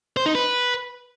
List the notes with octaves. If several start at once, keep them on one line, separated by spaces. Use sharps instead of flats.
C5
D#4
B4